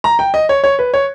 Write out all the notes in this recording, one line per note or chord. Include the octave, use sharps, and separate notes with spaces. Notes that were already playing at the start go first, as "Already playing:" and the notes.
A#5
G5
D#5
C#5
C#5
B4
C#5